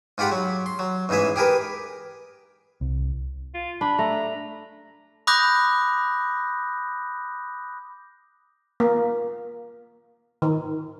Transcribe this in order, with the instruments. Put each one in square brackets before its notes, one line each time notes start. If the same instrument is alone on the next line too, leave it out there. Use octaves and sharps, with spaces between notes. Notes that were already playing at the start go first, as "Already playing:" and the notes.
[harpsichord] G#2 F4 G4 F#5 B5
F#3
C6
F#3
A1 G#2 E3 G#4 E5
G4 G#4 A#4 B4
[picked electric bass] C2
[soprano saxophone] F4
[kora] D4 [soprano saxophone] B5
[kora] A3 [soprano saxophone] A#5
[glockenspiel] B5 D6 D#6 F#6 G6 A#6
[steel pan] A#3
D#3